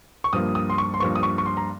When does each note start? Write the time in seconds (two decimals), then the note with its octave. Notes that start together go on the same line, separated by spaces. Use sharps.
0.24 C#6
0.33 G2 F3 A#3 D#6
0.55 D#6
0.70 C6
0.78 C#6
0.94 C6
1.00 G2 F3 A#3 C#6
1.15 D#6
1.23 C#6
1.38 C#6
1.46 C6
1.57 A#5